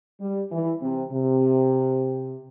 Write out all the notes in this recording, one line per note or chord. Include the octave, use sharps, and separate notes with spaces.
G3
E3
C3
C3